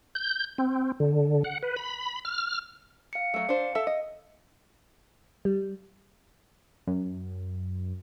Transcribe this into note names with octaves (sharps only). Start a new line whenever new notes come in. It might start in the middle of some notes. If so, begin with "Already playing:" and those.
G6
C4
D3
F#5
B4
B5
F6
F5 C#7
F#3 A3
D4 C5
A4 E5
D#5
G3
F#2